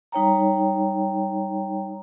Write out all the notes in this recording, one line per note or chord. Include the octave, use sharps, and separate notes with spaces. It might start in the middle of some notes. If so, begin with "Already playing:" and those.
G3 D#4 C#5 G5 A#5